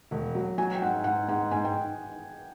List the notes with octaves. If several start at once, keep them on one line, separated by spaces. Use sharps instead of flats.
E1
F#3
F#3 G#5
G5
G#2 F#5
G#2 F#5
G#2 F#5
G#2 G#5
G5